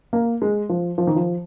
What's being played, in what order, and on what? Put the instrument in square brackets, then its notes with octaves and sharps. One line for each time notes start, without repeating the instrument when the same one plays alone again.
[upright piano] A#3
G#3
F3
F3
D#3
F3